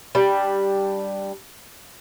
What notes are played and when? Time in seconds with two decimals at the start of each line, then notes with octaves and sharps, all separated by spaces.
0.15 G3 D4